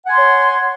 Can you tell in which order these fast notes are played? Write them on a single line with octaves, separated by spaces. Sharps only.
F#5 G#5 C6 C#5